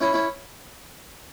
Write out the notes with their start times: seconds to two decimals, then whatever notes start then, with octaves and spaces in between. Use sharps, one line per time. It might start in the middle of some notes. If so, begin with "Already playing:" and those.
0.01 C#4 E4
0.13 C#4 E4